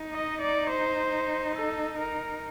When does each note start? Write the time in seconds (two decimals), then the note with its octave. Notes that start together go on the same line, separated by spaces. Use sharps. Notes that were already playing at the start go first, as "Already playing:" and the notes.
Already playing: D#4
0.13 D#5
0.41 D5
0.70 C5
1.56 A4
1.99 A#4